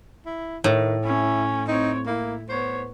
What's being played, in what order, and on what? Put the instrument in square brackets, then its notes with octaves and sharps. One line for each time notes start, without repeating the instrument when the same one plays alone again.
[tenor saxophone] E4
[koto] A2 [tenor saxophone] D#3
[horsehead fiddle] C#4 [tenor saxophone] E4
[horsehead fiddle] C4 C#5 [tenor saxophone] D#4
[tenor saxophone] A#3 [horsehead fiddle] E4
[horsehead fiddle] B3 C#5 [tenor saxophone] C5